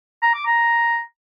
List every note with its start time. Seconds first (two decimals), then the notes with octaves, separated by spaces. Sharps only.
0.22 A#5
0.34 D6
0.46 A#5